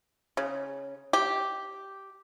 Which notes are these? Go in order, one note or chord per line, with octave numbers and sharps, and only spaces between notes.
C#3
G4